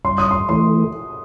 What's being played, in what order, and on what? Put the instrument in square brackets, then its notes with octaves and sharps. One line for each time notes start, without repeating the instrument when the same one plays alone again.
[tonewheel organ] G2 [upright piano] C6
[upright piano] D#6
C6
[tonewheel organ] E3 A3 [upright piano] C6